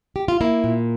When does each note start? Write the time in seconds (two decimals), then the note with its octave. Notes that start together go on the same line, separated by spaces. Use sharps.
0.16 G4
0.28 F4
0.41 A#3 E4
0.64 A#2